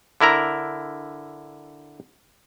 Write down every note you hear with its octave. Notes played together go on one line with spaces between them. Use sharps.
D3 E4 A#4 A#5